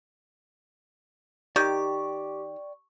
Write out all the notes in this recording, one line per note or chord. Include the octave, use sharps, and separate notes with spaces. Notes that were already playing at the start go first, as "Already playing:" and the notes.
D#3 G4 D5 G5 C#6